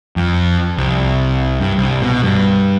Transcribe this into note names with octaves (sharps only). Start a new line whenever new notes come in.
F2
C2
G2
C2
B2
G2